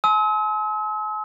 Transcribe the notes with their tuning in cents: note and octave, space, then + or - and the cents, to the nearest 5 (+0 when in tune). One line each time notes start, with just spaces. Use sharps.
G#5 +45 C6 -20 E6 -45